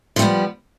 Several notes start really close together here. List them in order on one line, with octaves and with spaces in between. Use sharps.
F3 G3 B3